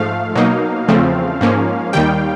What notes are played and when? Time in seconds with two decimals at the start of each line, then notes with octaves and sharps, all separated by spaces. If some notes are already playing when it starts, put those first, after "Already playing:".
Already playing: G#2 F3 A3 F5
0.36 B2 F#3 A#3 D#4
0.88 E2 C#3 F3 A3 C4
1.41 G#2 F3 A#3 C#4
1.93 D#2 D#3 G3 G5